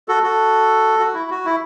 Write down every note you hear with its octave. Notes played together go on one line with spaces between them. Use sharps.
F#4 A4
F#4 A4
F#4
E4
F#4
E4